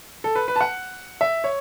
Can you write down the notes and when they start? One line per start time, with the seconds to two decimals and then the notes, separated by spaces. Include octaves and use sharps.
0.24 A4
0.35 B4
0.48 B4
0.56 A5
0.61 F#5
1.21 E5
1.44 C#5